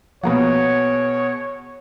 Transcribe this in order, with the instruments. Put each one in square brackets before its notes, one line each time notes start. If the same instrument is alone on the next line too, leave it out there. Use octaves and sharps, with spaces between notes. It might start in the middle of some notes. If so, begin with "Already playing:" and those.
[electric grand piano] B2 G#4 F#5 [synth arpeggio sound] F3 A#3 B3 [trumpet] C#5